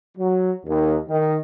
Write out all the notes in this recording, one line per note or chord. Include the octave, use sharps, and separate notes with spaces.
F#3
D#2
D#3